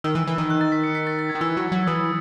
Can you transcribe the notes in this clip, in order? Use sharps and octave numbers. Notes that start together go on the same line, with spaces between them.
D#3 E6
E3
E3
D#3
F#6
A6
B6
C#7
B6
A6
A6
G#6
D#3
E3 E6
F#3
F#3
E3 D#6